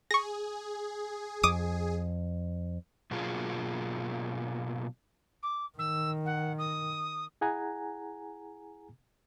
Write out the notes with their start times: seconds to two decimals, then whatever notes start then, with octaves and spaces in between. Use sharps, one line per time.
0.11 G#4 C#6 A#6
1.43 F2 D6 D#6 D#7
3.11 B2 F#3 A#3 D4 F4 G#4
5.42 D6
5.79 D#3 E6
6.25 F#5
6.58 D#6
7.41 E4 G#4 F#5 G#5 A#5